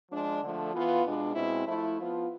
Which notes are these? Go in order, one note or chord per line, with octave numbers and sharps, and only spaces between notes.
F3 G#3 D4
D3 F3 A3
E3 B3 F4
B2 G#3 D4
B2 G#3 C4 E4
F3 A3 E4
F3 B3 F4